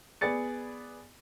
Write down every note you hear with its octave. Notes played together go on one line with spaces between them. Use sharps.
B3 G#4 D5 A6 C#7